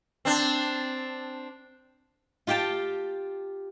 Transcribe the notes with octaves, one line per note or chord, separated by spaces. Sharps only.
C4 D4
F4 G4 F5 G5 A5